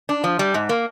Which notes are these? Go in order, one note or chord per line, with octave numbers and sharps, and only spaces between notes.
D4
F3
G3
G#2
A#3